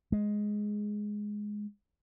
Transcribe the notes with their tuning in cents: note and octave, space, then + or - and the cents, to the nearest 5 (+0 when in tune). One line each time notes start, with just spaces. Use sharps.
G#3 +5